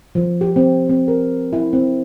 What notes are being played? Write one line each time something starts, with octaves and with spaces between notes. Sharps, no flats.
F3
G4
C4
C4
A#4
E4
C4